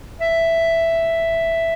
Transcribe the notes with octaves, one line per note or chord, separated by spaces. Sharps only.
E5